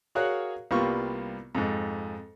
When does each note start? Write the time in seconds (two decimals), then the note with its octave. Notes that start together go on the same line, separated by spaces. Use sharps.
0.15 F#4 G#4 A#4 C#5 F5 F#6
0.71 C2 G3 A#3 B3 F4 C#6
1.55 F2 G#2